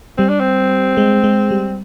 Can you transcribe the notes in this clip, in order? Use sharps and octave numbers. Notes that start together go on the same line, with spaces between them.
G3 C4
D4
C4
G#3
G#3
G3